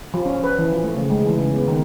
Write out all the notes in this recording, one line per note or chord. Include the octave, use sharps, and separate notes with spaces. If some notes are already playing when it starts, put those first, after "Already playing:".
F3
C#4
B4
E3
F3
A3
C#3
G#3
E3
C#3
B3
D#3